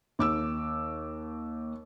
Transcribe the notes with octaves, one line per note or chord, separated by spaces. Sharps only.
D#2 D6 E6